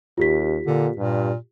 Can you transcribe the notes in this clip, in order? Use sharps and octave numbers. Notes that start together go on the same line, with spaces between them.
D#2 F4 G4 B6
A#2 D3
G2 A#2